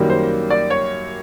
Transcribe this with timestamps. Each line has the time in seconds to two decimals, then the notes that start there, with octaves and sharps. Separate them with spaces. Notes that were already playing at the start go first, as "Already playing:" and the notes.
Already playing: F#2 D#3 G3 A#3
0.10 C5
0.50 D5
0.70 C#5